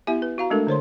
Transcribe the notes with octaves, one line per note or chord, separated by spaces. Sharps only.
B3 E4 G4 E5 G#5
B4
F#4 F5 A#5
G#3 A3 D4 A4 A#4
D3 C5 C#5 C6